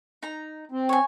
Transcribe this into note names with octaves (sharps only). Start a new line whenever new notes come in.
D#4 A#5
C4
C#5 G#5